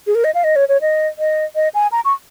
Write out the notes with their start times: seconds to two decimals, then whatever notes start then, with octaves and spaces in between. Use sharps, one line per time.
0.07 G#4
0.15 A#4
0.24 D#5
0.35 F5
0.44 D#5
0.56 C#5
0.69 C#5
0.81 D#5
1.19 D#5
1.56 D#5
1.75 G#5
1.92 A#5
2.05 C#6